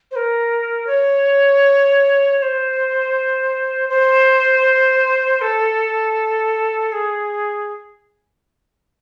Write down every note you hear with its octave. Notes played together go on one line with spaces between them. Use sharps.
C5
A#4
C#5
C#5
C5
C5
A4
G#4